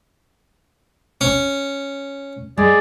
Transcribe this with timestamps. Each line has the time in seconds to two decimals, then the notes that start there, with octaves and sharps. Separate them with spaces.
1.21 C#4
2.58 G#3 G#4 D5